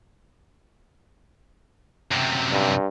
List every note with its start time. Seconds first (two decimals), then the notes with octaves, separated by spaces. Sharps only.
2.12 F#2 C3
2.52 G2